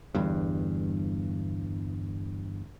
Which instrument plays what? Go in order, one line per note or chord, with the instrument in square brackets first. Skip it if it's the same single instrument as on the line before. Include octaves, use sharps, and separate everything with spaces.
[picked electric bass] G1 E2 G2